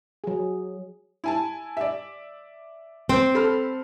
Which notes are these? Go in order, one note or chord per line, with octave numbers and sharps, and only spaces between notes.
F#3 G#4
E4 G#5 A5
D5 E5
C4
A4 B5 F6